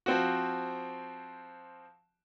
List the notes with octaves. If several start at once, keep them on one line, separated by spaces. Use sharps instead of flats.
F3 C4 F#4